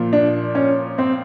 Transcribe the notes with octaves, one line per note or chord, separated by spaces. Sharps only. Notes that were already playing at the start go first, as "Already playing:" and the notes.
Already playing: A#2 F3
D4
C#4
C4